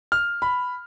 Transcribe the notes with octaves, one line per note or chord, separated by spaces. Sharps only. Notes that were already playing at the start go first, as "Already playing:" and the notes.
F6
B5